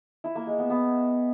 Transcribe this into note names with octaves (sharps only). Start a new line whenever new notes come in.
E4
A#3
G#3
B3
B3